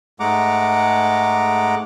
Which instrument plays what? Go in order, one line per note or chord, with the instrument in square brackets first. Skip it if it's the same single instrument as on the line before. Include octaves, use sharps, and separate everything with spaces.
[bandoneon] G#2 G#3 A3 F#5 A#5 D6